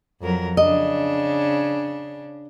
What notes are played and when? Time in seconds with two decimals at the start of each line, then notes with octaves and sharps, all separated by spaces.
0.21 F2 F#3 A#4
0.57 C#3 D4 D#5